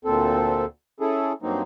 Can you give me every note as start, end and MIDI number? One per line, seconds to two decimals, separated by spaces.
0.05 0.65 38
0.05 0.65 46
0.05 0.65 60
0.05 0.65 69
1.00 1.33 61
1.00 1.33 64
1.00 1.33 68
1.00 1.33 69
1.42 1.62 43
1.42 1.62 54
1.42 1.62 58
1.42 1.62 60
1.42 1.62 63